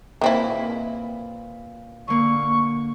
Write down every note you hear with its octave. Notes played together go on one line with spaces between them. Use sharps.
A#2 D#3 C4 E4 B4
D3 A#3 C#6